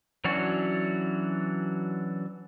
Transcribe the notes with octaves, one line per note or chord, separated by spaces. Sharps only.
E3 F#3 C#4 D4 F#4